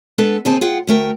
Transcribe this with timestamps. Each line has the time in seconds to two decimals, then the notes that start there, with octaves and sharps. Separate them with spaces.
0.18 G#3 B3 D4 A4 B4
0.45 D#2 D3 C4 D#4 G#4 A5
0.61 F4 G#4 F#5 G5
0.87 D2 A3 A#4 G5